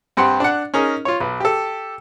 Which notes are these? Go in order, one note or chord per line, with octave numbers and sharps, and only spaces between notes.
G2 C4 G4 F#5 C6
D4 F#5
C#4 D#4 G#4 A#4
F4 C#5
B1 B4
G4 A4